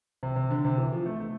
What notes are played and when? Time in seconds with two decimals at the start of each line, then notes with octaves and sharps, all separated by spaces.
0.23 C3
0.36 C3
0.50 D3
0.65 C3
0.78 E3
0.92 F3
1.06 A3
1.20 A3